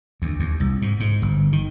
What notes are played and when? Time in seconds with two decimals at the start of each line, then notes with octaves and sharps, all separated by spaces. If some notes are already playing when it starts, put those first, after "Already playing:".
0.22 D2
0.40 D#2
0.60 C2
0.82 G#2
1.00 G#2
1.22 G1
1.52 D#3